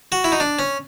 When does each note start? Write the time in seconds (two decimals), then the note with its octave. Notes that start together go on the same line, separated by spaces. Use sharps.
0.12 F#4
0.24 E4
0.32 D#4
0.40 D4
0.59 C#4